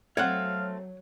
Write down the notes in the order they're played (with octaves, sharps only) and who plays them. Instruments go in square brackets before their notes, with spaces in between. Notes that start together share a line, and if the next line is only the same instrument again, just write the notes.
[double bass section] F#3 [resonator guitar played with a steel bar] A3 C4 [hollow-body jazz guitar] C#5 F#5 [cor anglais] F5